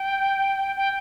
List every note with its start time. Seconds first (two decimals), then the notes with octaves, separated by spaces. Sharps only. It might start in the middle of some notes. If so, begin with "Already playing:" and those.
Already playing: G5
0.77 G5